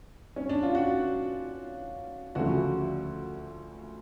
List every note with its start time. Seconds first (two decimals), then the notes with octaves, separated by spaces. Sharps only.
0.36 C#4
0.49 D4
0.63 F4
0.75 F#4
2.35 D2 C#3 F3 A3 F#4